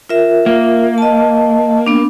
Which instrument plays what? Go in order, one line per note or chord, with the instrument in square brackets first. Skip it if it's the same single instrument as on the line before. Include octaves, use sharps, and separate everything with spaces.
[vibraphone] F4 A#4 E5
[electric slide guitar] A#3
[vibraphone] D#5 A5
B3 D4